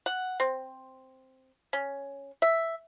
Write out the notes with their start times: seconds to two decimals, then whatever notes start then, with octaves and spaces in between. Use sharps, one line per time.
0.06 F#5
0.40 C4
1.73 C#4
2.42 E5